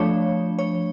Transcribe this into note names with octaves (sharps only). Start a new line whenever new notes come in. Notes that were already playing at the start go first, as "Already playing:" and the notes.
Already playing: F3 A3 D4 C#5
C#5